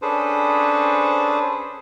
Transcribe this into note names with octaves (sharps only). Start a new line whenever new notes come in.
C#4 D4 G#4 A4 B4 C5